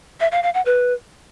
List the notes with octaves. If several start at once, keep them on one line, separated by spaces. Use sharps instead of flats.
E5
F5
F5
F#5
B4